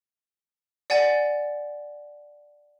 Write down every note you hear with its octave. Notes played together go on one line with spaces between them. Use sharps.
D5 F#5 G#5 A6